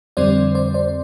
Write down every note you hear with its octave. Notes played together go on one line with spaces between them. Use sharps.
F2 D3 G3 C4 C5 D5
C5 D5
C5 D5